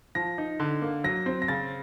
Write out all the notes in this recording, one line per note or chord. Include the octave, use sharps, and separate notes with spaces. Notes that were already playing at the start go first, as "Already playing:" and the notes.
F3 A#6
D#4
D3
A#3
F#3 A#6
C4
A#6
C#3 A6